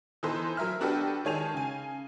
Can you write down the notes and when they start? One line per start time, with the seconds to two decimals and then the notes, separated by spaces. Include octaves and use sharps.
0.23 E3 B3 D#4 A4 B4 C5
0.57 F#3 A#4 E5 F6
0.80 B3 D4 F#4 G4 A4 B4
1.25 D#3 G#3 C#5 G#5 A5 F7
1.54 C#3 G#5